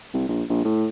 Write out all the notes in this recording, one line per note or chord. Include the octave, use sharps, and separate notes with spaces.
C2
A#1
A#1
A2